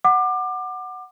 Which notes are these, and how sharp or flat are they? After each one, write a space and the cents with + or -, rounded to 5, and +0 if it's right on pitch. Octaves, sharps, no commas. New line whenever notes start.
F#5 +0 D6 +25